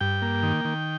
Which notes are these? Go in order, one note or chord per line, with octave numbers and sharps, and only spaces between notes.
G2 G5
A#3
D#3
D#3